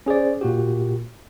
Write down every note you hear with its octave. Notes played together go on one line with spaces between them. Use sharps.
C#4 G#4 C5 D5
A#2 F#4 G4